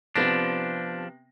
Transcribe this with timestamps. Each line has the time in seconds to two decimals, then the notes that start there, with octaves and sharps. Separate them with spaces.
0.16 C3 F3 B3 D4 A#6